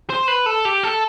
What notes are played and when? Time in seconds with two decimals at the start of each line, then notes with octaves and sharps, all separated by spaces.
0.10 C5
0.28 B4
0.46 A4
0.65 G4
0.83 A4